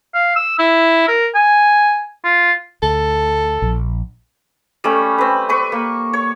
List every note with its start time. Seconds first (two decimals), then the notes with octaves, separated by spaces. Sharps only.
0.15 F5
0.36 E6
0.59 E4
1.08 A#4
1.35 G#5
2.25 F4
2.82 D2 A4
3.62 A#1
4.84 G3 A3 C#4
5.18 C4 B4
5.49 B4 C#6 D6
5.72 A#3
6.13 C#5